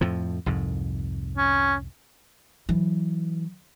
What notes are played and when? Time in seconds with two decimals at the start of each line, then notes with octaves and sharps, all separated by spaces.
0.01 F2 A2 F3
0.46 C2 F2 G#2
1.38 C#4
2.69 E3 F#3